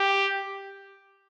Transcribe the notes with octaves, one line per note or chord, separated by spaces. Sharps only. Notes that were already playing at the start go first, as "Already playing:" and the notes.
Already playing: G4